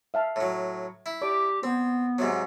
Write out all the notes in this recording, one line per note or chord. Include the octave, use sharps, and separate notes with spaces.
E5 F5 A5
A2 F#3
E4
G4 D5 D6
B3 C4 C5
G#2 C3 F#3